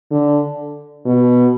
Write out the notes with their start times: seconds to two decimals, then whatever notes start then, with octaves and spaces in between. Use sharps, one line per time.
0.11 D3
1.06 B2